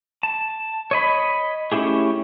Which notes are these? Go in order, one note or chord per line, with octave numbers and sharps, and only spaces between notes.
A5
C#5 D#5 B5
A3 C#4 E4 G4 G#4